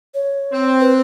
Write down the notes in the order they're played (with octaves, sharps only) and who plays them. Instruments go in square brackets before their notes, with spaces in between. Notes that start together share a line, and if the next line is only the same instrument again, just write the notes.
[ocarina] C#5
[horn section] C4
[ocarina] B4